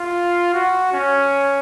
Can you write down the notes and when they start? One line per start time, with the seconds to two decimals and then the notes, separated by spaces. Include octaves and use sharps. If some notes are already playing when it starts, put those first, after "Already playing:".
Already playing: F4
0.53 F#4
0.93 C#4